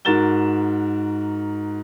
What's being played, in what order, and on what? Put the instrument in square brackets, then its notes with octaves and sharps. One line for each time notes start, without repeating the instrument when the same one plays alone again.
[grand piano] G#2 F#4 A#4 A6 E7 G7